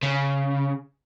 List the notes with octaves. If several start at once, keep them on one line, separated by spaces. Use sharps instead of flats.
C#3